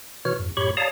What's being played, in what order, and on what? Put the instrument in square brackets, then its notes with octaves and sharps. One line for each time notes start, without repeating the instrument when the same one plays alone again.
[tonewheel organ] B2 E3 F#4 C#5 F6
F2 G#2
F#2 A2 G4 C#5 B5 C#6
C#5 D5 F5 A5 A#5 D#6